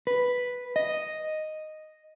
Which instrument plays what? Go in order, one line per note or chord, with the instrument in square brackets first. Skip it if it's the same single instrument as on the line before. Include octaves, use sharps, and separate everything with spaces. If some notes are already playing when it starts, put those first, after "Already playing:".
[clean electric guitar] B4
D#5